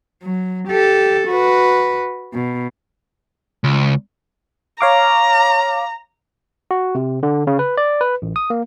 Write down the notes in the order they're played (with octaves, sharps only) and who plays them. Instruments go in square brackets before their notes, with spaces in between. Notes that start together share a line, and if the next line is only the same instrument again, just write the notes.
[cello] F#3
G4 A4
F#4 B4
B2
[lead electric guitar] C#2
[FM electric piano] C#5 F5 D6 [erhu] A#5
[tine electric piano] F#4
C3
D3
C#3
B4
D5
B4
A1
D#6
A#3